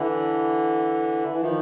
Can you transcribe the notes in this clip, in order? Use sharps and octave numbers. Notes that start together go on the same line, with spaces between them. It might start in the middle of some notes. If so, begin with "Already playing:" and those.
Already playing: D3 E3
E3
D#3 F3